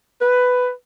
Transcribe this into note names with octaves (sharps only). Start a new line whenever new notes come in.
B4